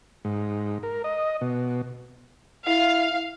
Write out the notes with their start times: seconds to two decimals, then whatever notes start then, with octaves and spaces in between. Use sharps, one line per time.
0.25 G#2
0.83 A#4
1.04 D#5
1.41 B2
2.68 E4 F5